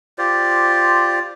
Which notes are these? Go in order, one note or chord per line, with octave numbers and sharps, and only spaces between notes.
F4 G4 C5 D5